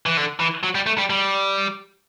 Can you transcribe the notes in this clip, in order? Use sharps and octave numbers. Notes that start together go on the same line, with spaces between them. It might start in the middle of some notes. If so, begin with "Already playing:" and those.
E3
D3
E3
F#3
G3
A3
G3
G3